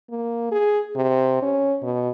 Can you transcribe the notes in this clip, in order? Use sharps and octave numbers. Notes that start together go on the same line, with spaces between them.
A#3
G#4
C3
C#4
B2